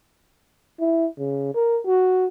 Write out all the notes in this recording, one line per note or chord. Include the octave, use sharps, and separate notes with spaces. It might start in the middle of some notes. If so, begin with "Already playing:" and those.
E4
C#3
A#4
F#4